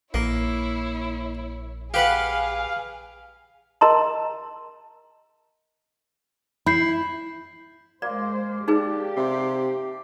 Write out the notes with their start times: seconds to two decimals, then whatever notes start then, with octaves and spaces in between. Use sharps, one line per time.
0.14 A#1 A#3 E4 C#5
1.94 G4 G#4 B4 F5 F#5
3.81 A#4 D#5 A5 A#5 C6
6.66 E4 B5 G6 C7
8.02 G#3 A#3 C5 D5
8.68 D4 D#4 G4 G#4 B4
9.17 C3 C6